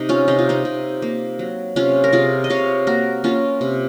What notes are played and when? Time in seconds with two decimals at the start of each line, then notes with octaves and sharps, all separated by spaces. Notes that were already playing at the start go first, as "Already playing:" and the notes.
Already playing: C3 D#4
0.09 C#4 F4
0.28 C3 D#4
0.39 F4
0.49 C4 D#4
0.65 C3
1.02 A#3
1.39 F#3
1.76 C3 C#4 F4
2.04 A#4
2.13 C3 F4 G#4
2.44 D#5
2.50 C3 C#5 F5
2.87 A#3 F#4 A#4
3.24 A#3 C#4 F4
3.61 C3